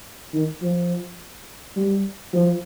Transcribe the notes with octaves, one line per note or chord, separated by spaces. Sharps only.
D#3
F3
G3
F3